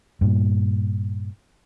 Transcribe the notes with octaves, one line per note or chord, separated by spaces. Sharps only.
G2 A#2